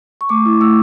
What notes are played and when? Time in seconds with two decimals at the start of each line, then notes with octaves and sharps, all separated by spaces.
0.21 C#6
0.29 A3 D6
0.46 E4
0.60 A3 E6